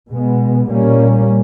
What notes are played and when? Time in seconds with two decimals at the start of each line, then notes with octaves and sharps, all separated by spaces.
0.10 B2 G#3 B3
0.68 A#2 G3 A#3 C#4